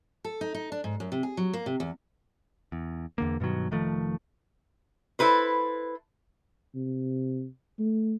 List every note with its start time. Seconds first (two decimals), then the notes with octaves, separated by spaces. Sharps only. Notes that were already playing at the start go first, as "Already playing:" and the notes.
0.24 A4
0.41 D#4
0.54 D#4
0.72 D4
0.84 G#2
1.00 F#2
1.12 C3
1.23 G#4
1.37 F#3
1.54 A#3
1.66 C3
1.80 E2
2.72 E2
3.18 E2 D3 A#3
3.40 G2 B2 D#3 F#3
3.71 F1 D#3 F3 A3
5.19 E4 A4 B4 C5
6.75 C3
7.79 A3